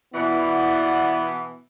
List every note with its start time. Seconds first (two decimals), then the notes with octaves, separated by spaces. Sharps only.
0.14 B2 E3 B3 E4 D5 F#5